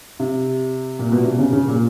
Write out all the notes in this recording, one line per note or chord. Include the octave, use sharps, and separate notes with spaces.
C3
A#2
B2
C3
C#3
C#3
A#2